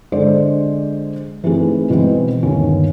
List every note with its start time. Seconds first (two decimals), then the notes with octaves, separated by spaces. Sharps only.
0.12 D3 G#3 A4 C5 D5
1.44 E3 A3 C4 D#4 G#4
1.90 B2 E3 G#3 B3 C4
2.43 G1 D#2 B3 C#4